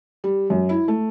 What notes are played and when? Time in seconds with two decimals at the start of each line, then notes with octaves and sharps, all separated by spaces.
0.24 G3
0.50 F#2
0.69 E4
0.88 A3